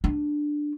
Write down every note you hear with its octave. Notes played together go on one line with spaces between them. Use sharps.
D4